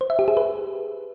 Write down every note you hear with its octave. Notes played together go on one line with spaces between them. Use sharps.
C5
E5
G4
G#4
B4